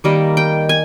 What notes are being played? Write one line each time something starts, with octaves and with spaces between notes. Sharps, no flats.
D#3 G3 A#3 D#5
G5
G#5